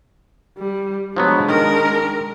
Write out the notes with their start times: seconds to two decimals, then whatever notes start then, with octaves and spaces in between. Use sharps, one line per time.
0.58 G3
1.16 F3 F#3 G#3 B3 D4
1.49 D#3 A#4